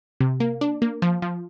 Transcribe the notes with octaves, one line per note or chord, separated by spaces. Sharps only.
C3
A#3
D4
A#3
F3
F3